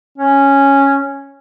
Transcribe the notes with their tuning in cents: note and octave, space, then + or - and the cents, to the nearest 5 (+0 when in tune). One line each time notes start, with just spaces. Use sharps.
C#4 -5